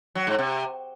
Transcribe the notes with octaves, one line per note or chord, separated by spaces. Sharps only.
F#3
G#2
C3